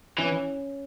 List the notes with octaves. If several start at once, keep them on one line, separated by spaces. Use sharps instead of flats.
E3 C#4